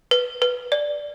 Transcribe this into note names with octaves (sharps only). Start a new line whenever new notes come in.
B4
B4
D5